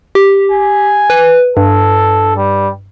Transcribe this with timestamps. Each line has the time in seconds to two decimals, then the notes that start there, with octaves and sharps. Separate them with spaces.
0.15 G4
0.52 G#5
1.10 B4
1.57 G2 A4
2.37 G3